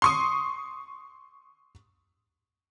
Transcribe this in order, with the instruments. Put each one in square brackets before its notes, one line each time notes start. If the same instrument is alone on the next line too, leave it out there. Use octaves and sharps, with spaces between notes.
[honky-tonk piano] C6 C#6 D#6